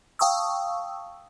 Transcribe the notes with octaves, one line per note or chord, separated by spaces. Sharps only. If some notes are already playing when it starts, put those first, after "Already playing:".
F5 G5 A5 C#6 D#6 E6